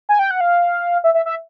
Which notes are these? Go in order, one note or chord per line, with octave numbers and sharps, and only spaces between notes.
G#5
G5
F#5
F5
E5
E5
E5